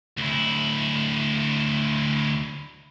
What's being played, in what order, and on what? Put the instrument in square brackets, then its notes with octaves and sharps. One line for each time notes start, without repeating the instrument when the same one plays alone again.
[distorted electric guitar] D2 E4